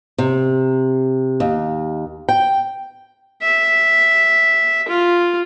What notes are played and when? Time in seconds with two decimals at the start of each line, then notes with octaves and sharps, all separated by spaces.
0.18 C3
1.40 D#2
2.29 G5
3.42 E5
4.88 F4